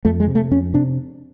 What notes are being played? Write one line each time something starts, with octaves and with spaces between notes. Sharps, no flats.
F2 A3
G#3
C3
A3
F2 C#4
C3 D4